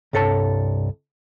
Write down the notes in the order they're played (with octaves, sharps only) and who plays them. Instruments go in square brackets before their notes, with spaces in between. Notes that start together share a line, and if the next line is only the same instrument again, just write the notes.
[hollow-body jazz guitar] C2 G2 A4 C#5 A5